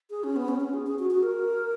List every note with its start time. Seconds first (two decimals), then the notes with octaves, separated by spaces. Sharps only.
0.10 G#4
0.24 C#4
0.36 B3
0.48 C#4
0.60 C#4
0.74 G#4
0.87 G#4
0.99 F#4
1.11 F#4
1.23 A#4